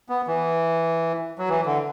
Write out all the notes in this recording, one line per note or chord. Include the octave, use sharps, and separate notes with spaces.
B3
E3
F#3
E3
D3